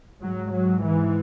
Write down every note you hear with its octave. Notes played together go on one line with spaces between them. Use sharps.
G#2 F#3
F#3
E3